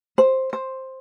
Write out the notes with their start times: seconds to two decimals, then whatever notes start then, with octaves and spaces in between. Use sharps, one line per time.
0.18 C5
0.53 C5